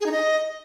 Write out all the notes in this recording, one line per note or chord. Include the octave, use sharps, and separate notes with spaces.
G#4
D#4
D#5